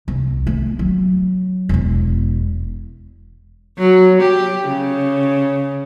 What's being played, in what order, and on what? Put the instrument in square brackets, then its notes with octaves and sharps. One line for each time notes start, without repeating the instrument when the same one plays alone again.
[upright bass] C2
A3
F#3
E1 E2
[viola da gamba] F#3
G4
C#3